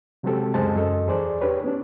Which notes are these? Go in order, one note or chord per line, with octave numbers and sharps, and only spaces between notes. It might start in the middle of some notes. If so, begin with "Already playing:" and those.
C3 F#3 G#3 C4 G4 A4
C#2 F#2 G#3 C5 D#5 A5
F#2 A4 D#5
E2 G#4 C5 D5
D4 G4 B4 C#5
B3 C#4 D4